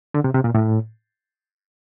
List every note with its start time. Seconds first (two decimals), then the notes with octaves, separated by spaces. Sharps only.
0.14 D3
0.24 C3
0.34 C3
0.44 A#2
0.54 A2